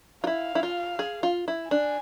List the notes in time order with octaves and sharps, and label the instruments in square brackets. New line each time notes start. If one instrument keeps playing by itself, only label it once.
[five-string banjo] F4
[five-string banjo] E4 [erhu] F5
[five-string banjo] E4
F4
G#4
F4
E4
[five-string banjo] D4 [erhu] G#5